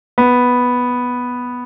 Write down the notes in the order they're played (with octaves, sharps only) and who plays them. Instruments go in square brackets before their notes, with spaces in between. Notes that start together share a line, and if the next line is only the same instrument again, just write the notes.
[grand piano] B3